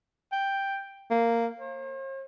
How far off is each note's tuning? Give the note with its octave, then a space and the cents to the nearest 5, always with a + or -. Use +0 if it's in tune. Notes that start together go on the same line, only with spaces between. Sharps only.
G5 +5
A#3 -10
C5 +45